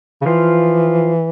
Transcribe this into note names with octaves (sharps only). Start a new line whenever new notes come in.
C#3
E3 F3 F4